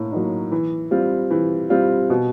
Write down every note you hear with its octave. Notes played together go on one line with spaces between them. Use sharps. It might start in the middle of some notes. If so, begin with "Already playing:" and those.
Already playing: A2 A#3
F#3 A#3 D#4
E3
G3 C4 F4
E3
G3 C4 F4
B2